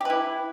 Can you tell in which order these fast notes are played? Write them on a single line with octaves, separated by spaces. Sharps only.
G4 B4 E4